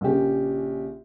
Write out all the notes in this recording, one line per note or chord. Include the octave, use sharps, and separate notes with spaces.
A#1 C#3 G4